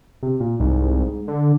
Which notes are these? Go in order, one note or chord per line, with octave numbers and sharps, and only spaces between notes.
C3
A#2
C2 G#2
D3